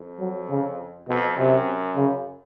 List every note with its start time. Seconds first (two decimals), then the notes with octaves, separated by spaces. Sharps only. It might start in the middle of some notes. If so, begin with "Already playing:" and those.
Already playing: F2
0.19 F#3
0.50 C#3
1.08 F2 B2
1.37 F#2 C3
1.96 C#3